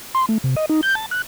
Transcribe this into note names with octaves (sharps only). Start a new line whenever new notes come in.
C6
A3
C3
D#5
D#4
G6
A5
F#6